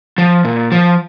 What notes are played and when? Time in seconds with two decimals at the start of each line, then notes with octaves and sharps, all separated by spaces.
0.18 F3
0.45 A#2
0.72 F3